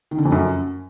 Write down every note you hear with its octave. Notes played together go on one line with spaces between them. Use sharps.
D#3
D3
F2
F#2